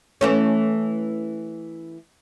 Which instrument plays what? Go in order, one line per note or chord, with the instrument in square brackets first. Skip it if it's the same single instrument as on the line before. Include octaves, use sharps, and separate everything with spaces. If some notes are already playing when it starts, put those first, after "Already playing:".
[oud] E3 A3 C#4